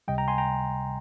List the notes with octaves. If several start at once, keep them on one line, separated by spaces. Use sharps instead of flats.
C#2 C3 G3 D#5 G5
G5 A#5
G#5 C6
G5 A#5